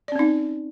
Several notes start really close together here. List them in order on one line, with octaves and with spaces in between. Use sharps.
D5 C#4 C4 D#4